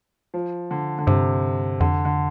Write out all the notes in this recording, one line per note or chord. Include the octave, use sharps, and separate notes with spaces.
F3
D3
D3
G2 C3
F2 D3
D3